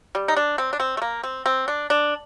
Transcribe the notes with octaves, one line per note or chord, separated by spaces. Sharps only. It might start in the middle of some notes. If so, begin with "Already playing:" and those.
G3
D#4
D4
C4
D4
C4
A3
A#3
C4
C4
D4
D4